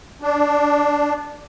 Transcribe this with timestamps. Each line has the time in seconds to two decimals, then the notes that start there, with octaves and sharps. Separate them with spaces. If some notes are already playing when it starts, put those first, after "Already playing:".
0.22 D4